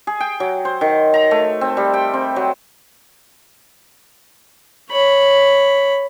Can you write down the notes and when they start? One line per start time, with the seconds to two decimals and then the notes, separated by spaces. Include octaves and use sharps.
0.07 G#4
0.20 G5
0.40 F#3
0.65 C5
0.81 D#3
1.14 A#5
1.31 A3
1.61 C4
1.77 G3
1.94 G5
2.14 C4
2.36 F#3
4.91 C#5 B5